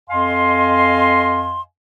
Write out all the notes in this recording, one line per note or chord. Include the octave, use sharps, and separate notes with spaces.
F2 D#5 F5 G#5 C6